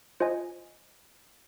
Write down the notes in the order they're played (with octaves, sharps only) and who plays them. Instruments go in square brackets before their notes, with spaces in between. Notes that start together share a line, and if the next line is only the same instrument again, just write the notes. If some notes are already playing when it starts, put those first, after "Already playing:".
[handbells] F4 C5 D#5 G#5